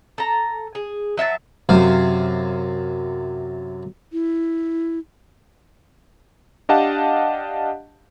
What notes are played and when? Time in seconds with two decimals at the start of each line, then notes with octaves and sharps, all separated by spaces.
0.18 A4 A#5
0.75 G#4
1.17 F#3 E5 F5 A5
1.69 F#2 C3 C5 F5
4.13 E4
6.69 D4 G4 D#5 F5 F#5 A5